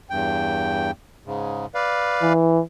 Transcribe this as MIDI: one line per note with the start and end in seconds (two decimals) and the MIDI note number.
0.10 0.91 40
0.10 0.91 43
0.10 0.91 79
1.26 1.66 44
1.26 1.66 49
1.75 2.33 71
1.75 2.33 74
1.75 2.33 77
2.22 2.60 52